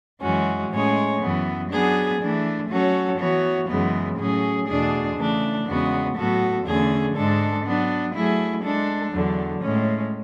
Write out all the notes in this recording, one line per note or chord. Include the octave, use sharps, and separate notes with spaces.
F#2 E3 G#3 C#4 F#4
A2 G#3 C#4 G#4 C#5
F#2 E3 B3
F#3 B3 D4 G#4
E3 A3 D4
F#3 C#4 F#4 A4 C#5
E3 B3 F#4 C#5
F#2 C#3 E3 G#3 B3
A2 F#3 C#4 G#4
E2 B2 A3 D4 G#4
C#3 E3 A3 D4
E2 C#3 G#3 B3 F#4
A2 F#3 B3 F#4 A4
E2 D3 A3 C#4 G#4
G#2 G#3 D4 A4
F#3 B3 D4
F#3 A3 E4 G#4
G#3 D4 A4
E2 D3 F#3
A2 G#3 C#4